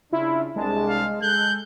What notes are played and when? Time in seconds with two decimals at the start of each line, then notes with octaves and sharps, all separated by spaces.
0.13 C#3 D4 E4 F4
0.56 C2 G#3 D4 A5
0.89 F5
1.22 G#3 A4 F#6 G6